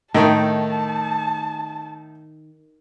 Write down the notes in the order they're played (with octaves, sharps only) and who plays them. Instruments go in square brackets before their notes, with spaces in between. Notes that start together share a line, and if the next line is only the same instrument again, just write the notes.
[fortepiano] A2 A3 D#4 [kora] D#3 [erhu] A5